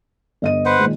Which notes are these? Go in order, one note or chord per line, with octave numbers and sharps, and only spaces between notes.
G1 D#5 D#7
B4 C5 F#5
A#2 D#3 G#3